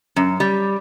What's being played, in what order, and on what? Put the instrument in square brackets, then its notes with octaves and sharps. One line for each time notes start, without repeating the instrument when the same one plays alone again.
[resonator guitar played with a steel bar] F#2
G3